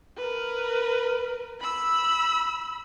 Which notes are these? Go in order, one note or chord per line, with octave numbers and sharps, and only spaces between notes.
A#4 B4
B5 E6